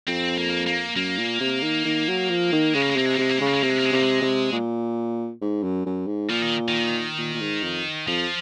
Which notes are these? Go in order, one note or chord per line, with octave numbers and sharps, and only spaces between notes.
F2 C4
A#3
A#3
F#2 A#3
A#2
C3
D#3
D#3
F#3
F3
D#3
C#3 G#3
A#3
G#3
C3 A#3
G#3
A#3
C3 G#3
A#3
C#3 G#3
A#3
G#3
C3 A#3
G#3
A#3
G#3
C3 A#3
G#3
C3
A#2
G#2
F#2
F#2
G#2
A#2 F3
D#3
D#3
A#2
A#2
G#2
F2
F2 F3